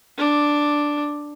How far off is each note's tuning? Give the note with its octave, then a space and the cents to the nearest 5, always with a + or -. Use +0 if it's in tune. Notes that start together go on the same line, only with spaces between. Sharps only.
D4 +0